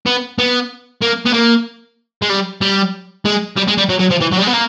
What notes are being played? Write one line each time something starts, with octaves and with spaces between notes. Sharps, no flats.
B3
B3
A#3
B3
A#3
G#3
G3
G3
G#3
G3
G#3
G3
F#3
F#3
F3
E3
F#3
G3
G#3
B3
A#3